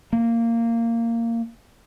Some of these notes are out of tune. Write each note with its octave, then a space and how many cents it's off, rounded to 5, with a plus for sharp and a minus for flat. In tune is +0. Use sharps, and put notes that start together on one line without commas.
A#3 -15